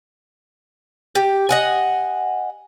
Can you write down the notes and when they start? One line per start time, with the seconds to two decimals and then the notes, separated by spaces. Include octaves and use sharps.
1.15 G4
1.49 D#5 F#5 G#5